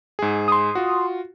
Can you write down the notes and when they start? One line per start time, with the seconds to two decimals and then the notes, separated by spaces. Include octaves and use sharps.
0.19 G#2 G#4
0.48 C6 D#6
0.75 F4 F#4